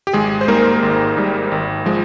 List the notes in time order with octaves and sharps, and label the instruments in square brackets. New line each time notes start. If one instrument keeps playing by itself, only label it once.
[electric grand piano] G4
G#1 G#3 G#4
C5
G#2 G3 A#3 A#4
G#1
G#2 G3
G#1
F3 G#3